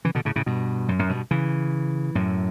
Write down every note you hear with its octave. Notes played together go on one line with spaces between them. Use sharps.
C#3 E3
B2 D3
A2 C#3
A2 C#3
G2 B2
F#2
F#2 A2
G2 B2
C#3 E3
F#2 A2